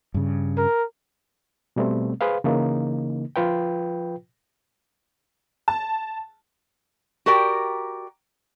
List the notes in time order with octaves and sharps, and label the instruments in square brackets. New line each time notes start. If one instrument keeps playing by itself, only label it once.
[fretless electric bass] G2 C#3
[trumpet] A#4
[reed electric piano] B2 G3 A3 C4
G#4 B4 C5 F5
C#3 E3 A#3 D#4
F3 F4 B4 G5
[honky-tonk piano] A5
[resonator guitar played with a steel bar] F#4 G4 A#4 D5 G5